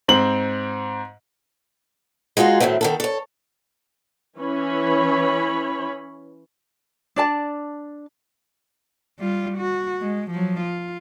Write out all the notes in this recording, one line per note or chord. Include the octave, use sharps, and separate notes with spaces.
G#2 C4 F#7
G#3 D#4 F4 F#4 G#4
A2 D#3 F#3 A3 C4
D#3 B3 A4
A4 C#5
E3 C#4 C#5 B5
D4 D5 A5
G3 F4
F#4
G#3
F3 F#3
F4